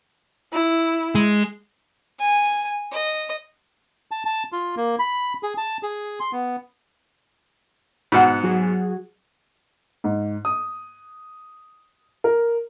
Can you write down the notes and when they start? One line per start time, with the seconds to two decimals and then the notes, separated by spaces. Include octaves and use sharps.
0.53 E4
1.15 G#3
2.20 G#5
2.92 D#5
4.11 A5
4.26 A5
4.52 F4
4.76 A#3
4.99 B5
5.43 G#4
5.58 A5
5.83 G#4
6.20 C6
6.32 B3
8.12 G#2 B2 F#5
8.43 F#3 F#4 G#4
10.04 G#2
10.45 D#6
12.24 A#4